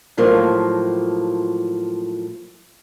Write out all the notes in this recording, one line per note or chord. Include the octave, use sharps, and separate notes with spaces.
A2 F3 F#3 A#3